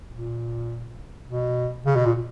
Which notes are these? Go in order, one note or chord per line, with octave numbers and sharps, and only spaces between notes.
A#2
B2
C#3
B2
A#2